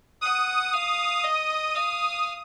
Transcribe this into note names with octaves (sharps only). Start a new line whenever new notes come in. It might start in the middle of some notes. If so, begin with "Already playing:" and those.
F#5 D#6
F5
D#5
F5